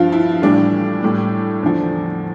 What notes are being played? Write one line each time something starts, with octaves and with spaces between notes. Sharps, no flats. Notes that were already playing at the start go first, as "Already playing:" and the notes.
Already playing: G2 F3 F4
E4
A2 E3 G3 D4
A2 G3
E2 D3 F3